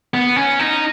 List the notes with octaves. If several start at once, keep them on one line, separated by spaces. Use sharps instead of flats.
B3
C#4
D#4